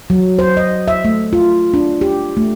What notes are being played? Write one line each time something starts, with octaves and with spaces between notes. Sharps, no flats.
F#3
C5
D#5
E5
A3
F4
D4
G4
A3